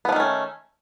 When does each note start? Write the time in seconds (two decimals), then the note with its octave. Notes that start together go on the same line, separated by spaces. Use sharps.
0.05 B3
0.09 F3
0.12 D#3
0.16 A3
0.20 C#4